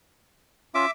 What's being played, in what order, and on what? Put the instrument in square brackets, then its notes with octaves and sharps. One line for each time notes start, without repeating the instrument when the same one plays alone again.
[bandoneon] C#4 F4 [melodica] E5 D6